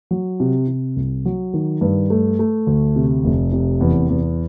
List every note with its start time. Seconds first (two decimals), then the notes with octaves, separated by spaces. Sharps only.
0.11 F#3
0.40 C3
0.68 C3
0.96 C2
1.25 F#3
1.53 D#3
1.81 G2
2.10 A3
2.39 A3
2.67 D2
2.96 C3
3.24 F1
3.53 C3
3.81 E2
4.09 E2